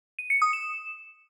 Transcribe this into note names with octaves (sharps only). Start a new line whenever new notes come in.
D#7
C#7
D#6
E7